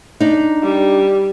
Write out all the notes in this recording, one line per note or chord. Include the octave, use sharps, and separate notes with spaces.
D4 D#4
G3